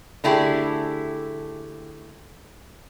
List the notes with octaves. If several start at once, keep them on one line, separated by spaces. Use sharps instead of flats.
D3 A3 E4 G4 G#4